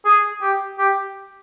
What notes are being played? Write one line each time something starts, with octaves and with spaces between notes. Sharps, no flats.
G#4
G4
G4